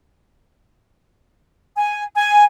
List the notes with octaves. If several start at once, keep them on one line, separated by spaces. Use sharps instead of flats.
G#5
G#5